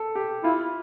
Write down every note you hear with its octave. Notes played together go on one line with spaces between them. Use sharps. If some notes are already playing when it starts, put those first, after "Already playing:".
Already playing: A4
G4
E4 F4